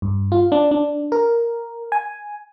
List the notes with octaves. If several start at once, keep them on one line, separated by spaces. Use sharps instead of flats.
G2
F4
D4
D4
A#4
G#5